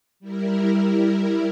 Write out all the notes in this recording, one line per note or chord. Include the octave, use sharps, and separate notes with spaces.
G3 E4 A#4